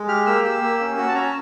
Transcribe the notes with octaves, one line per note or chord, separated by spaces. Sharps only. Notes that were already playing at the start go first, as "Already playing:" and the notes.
Already playing: G#3
G4 F6
A#3 E6
G4 E6
A#3
C#4
F#4
A5
C#4 A#5